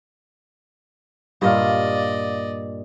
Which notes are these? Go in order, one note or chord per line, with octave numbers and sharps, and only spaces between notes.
G2 A#2 D5 D#5 F5